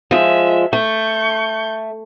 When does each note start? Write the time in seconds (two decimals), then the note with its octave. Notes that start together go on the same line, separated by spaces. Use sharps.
0.11 F3 G#3 E5
0.73 A3 C#6 G6